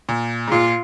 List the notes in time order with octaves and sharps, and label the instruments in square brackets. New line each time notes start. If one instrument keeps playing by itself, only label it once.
[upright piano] A#2
G#2
[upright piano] A#2 [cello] F4